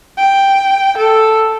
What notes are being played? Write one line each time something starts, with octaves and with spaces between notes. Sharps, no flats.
G5
A4